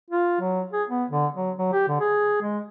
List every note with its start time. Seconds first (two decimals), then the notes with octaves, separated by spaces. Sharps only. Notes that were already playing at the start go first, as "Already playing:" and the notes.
0.11 F4
0.40 F#3
0.73 G#4
0.89 B3
1.10 D3
1.35 F#3
1.58 F#3
1.73 G4
1.88 D3
2.01 G#4
2.42 G#3